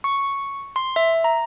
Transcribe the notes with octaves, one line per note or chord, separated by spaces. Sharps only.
C#6
C6
E5
A#5